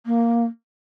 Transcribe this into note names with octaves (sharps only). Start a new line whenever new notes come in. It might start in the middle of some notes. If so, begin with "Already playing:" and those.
A#3